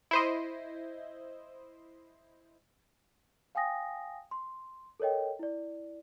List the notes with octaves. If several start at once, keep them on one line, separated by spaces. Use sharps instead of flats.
E4 C5 D#5
F5 G5 G#5 D#6 A#6
C6
A4 A#4 C#5 D#5 G5
E4 D5